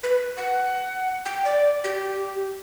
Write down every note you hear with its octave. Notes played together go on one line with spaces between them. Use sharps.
B4
F#5
G5
D5
G4